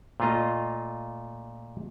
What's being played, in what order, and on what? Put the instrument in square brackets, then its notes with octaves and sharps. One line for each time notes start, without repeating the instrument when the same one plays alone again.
[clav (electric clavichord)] A#2 A3 F4 D#5 A#5